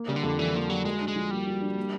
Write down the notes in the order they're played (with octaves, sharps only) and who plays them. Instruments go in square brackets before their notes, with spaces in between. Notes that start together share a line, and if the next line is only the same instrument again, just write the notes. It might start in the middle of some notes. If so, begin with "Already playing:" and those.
Already playing: [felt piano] A#3
[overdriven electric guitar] C#3 [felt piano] G3
[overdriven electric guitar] D3
[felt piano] F2
[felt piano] D3 [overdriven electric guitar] E3
[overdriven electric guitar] F3 [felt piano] A#3
[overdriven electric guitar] F#3 [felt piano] G3
[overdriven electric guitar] G#3 [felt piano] F#4
[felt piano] D4
[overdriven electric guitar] G#3
[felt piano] F3
[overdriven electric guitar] G3 [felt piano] A#3
[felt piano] F#4
D4
A#3